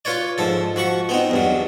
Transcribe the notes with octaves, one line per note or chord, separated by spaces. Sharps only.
F4 B4 C#5 D5
G#2 F3 A4
F3 F#4 B5 C#6
B3 C4 D#4
E2 G2 F#3